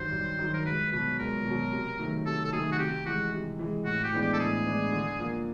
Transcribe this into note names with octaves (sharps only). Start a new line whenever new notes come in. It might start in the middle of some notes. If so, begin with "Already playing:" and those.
Already playing: G2 D#3 F#3 C5
G2
D#3 F#3
A#4
C#2 B4
B2 F#3 B4
C#2 A#4
B2
F#3
C3
D#3 F#3 A3
C3 A4
A4
D#3 F#3 A3 G#4
F#4
C3 G4
E3 G#3 F#4
C3
E3 G#3
A2 F#4
G4
E3 G#3 B3 D4
G4
A4
A2 G#4
E3 G#3 B3 D4
D3
F3 A#3